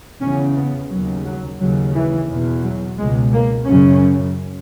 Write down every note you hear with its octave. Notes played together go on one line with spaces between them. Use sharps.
E2 C#3 C#4
B3
D#2 C#3 F#3
F#3
D#2 C#3 F#3
E3
E2 B2
F#3
C#2 B2 G#3
A#3
F#2 C#3 C#4